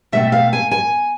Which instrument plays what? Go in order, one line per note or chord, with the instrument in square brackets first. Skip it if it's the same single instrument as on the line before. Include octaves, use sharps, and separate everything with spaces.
[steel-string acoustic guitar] B2 A3 C4 E5
F5
G#5
G#5